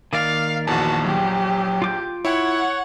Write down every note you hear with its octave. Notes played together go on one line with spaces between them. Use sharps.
D#3 A#3 D5 F5
A#1 E2 F#4 A5
F#3 G4
F4 D6 G6
E4 C#5 F#5